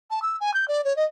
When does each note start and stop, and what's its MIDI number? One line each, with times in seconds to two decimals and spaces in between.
0.10 0.22 81
0.22 0.36 88
0.40 0.53 80
0.54 0.67 91
0.68 0.83 74
0.84 0.96 73
0.96 1.04 75